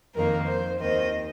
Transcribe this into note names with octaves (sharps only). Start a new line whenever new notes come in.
F2 D#3 A#3 A#4
C5
D#2 D#3 C4 D#5